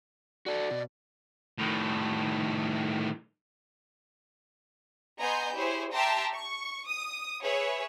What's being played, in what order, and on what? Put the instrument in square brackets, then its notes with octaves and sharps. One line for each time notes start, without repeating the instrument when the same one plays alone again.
[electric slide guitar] F#4 A4 [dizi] D5
[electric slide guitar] B2
[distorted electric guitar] A2 D#3
[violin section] B3 D#5 G#5 A#5 C6 G6
E4 G4 G#4 C5 C#5
G4 E5 G5 A5 A#5 C6
C#6
D#6
G#4 B4 C#5 E5